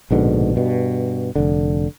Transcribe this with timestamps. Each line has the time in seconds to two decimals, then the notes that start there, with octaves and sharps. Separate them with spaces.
0.11 A#1 G#2 B2 D3
0.56 G2 B2
1.36 F1 D3